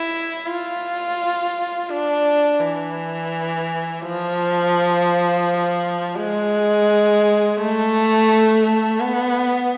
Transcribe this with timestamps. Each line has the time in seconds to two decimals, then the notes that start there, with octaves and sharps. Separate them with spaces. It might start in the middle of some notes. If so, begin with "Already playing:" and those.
Already playing: E4
0.47 F4
1.90 D4
2.60 E3
4.02 F3
6.15 G#3
7.57 A3
8.99 B3